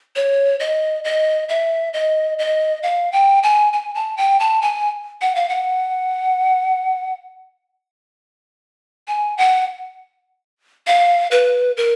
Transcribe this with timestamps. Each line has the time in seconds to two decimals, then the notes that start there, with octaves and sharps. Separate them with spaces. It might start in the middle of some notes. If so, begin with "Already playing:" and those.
0.16 C#5
0.60 D#5
1.04 D#5
1.49 E5
1.93 D#5
2.39 D#5
2.83 F5
3.13 G5
3.43 G#5
3.73 G#5
3.95 A5
4.17 G5
4.40 A5
4.62 G#5
5.21 F#5
5.35 F5
5.49 F#5
9.08 G#5
9.38 F#5
10.87 F5
11.31 B4
11.77 A#4